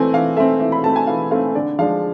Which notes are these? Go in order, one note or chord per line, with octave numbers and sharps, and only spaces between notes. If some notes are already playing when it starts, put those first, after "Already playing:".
Already playing: E3 A3 C4 G#5
E3 F5
A3 C4 E5
E3 E5
B5
A3 C4 A5
G#5
E3 F5
A3 C4 F5
D3 D5
F3 G#3 D4 F5